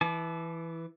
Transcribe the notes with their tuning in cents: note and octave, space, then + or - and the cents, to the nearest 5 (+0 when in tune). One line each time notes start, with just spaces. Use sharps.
E3 +0 A5 -35 D6 +20